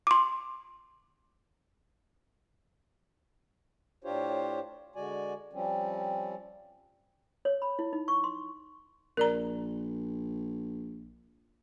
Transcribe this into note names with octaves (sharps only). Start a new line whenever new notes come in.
C6 D6
A2 D4 F4 G4 C5 C#5
D3 G#3 F#4 D5 G#5
F3 G3 C4 C#4
C#5
B5
E4
D#4
C#6
C6
A#1 A#4 D5 A#5